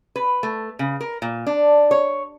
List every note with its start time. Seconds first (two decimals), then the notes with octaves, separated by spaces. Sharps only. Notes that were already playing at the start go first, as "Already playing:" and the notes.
0.16 B4
0.43 A3
0.79 C#3
1.01 A#4
1.22 A#2
1.47 D4
1.91 C#5